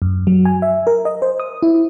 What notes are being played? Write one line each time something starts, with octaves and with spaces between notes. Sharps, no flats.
F#2
F#3
G#5
E5
A#4
D#5
C5
D#6
E4